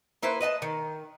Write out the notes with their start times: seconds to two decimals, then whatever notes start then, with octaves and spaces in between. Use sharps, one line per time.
0.23 A#3 E4 B4 C5
0.41 B4 D#5 F#5 A5
0.62 D#3